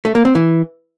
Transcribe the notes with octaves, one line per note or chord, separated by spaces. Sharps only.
A3
A#3
C4
E3